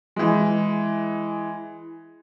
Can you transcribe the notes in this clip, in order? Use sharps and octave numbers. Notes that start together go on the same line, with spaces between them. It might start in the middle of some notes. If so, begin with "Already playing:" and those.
E3 G#3